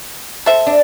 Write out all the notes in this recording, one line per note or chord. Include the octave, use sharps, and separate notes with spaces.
A4 C5 E5
D4